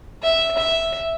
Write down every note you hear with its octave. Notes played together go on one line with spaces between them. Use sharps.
E5
E5